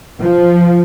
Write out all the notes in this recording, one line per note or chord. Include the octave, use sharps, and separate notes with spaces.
F3